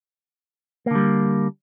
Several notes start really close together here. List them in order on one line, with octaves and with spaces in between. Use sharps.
A#3 D3 G3